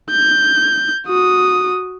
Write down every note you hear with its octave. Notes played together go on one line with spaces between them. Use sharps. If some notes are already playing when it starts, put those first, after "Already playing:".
G6
F#4 D#6